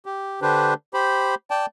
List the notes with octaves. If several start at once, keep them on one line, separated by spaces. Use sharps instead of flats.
G4
D3 D4 G4 B4 C5
G4 C5 B5
D5 G5 A5